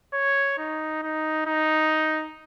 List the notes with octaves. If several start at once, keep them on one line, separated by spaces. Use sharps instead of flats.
C#5
D#4
D#4
D#4